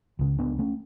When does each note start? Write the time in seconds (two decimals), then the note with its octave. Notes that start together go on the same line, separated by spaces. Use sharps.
0.19 C#2 C#3
0.39 B3 D4
0.59 A3 C#4